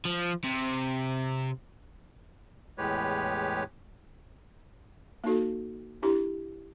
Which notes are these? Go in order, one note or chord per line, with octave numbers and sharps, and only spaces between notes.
F3
C3
E2 A2 G#3 G4 B4 C#5
A#3 D#4 F#4 A4
D4 E4 G4 C6